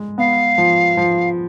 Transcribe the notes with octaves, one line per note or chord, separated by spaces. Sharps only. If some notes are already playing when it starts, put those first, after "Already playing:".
Already playing: G#3
B3 F5
F3
F3